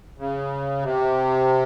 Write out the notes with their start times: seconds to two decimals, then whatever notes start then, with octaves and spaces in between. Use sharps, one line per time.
0.18 C#3
0.82 C3